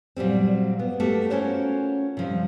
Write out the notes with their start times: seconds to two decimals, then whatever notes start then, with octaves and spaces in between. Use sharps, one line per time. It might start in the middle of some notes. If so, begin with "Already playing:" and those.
0.16 A#2 F#3 G3 C4
0.79 B3
1.00 A3 A#3 F#4 G4
1.30 C#4 F4 F#4 A#4 C5 C#5
2.17 C3 F3 G3